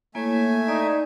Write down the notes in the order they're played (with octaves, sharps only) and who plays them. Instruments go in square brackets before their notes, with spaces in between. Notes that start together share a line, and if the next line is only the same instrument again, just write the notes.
[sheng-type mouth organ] A3 E5 G#5 [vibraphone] A#3 E4 C#5
[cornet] D#4 [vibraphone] D5